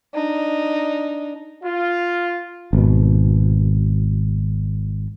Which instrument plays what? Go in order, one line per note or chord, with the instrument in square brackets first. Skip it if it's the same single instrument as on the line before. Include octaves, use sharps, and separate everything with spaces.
[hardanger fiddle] D4 D#4
[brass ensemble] F4
[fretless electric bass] G#1 B2